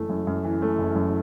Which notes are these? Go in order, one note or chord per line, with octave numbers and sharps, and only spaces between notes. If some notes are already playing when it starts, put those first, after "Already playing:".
Already playing: F#1 E3 A3
F#2
F#2
E3
A3
F#1
F#2